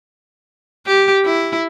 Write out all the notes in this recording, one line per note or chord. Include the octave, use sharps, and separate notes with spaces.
G4
E4